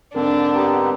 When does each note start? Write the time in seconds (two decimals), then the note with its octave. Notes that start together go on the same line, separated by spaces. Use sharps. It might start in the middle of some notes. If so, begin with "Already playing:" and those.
0.15 G#2 D3 C4 D4 A#4
0.55 B3 D#4 G4